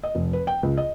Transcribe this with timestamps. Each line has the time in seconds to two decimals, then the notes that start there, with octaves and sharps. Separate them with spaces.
0.03 D#5
0.15 F1
0.33 B4
0.47 G5
0.63 C#2
0.77 D#5